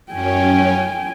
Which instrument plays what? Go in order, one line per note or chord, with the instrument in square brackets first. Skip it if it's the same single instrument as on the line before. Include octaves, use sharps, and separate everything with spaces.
[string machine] F#2 C#4 [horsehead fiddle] G5 G#5